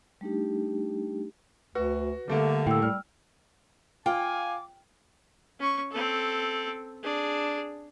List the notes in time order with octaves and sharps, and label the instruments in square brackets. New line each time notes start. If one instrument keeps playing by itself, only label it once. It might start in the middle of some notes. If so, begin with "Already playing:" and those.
[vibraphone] G3 A3 D4 D#4 G4
[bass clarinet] D2 [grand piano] F#4 [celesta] B4
[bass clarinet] D3 [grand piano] G3 A3 A#3
[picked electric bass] A2 [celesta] G5 E6
[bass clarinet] G3 [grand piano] F6
[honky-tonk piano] F4 [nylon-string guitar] G5 [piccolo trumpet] G#5 [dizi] D6
[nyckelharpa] C#4 C#6
C4 A4
D4 G#4